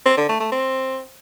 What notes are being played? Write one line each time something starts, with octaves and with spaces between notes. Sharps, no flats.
C4
D3
A3
A3
C4